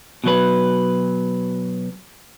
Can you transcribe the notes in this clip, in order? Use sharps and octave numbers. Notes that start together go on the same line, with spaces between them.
B2 F#3 B4